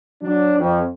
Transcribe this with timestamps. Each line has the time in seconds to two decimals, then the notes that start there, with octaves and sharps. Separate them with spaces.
0.22 F#3 D4
0.59 F2